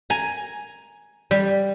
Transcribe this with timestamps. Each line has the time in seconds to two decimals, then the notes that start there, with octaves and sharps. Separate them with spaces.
0.10 G#5 A#5
1.31 G3